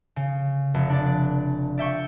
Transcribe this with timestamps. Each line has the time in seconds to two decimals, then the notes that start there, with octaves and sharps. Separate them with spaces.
0.16 C#3
0.74 F1
0.89 D4 D5
1.78 D5 E5 G5 C#6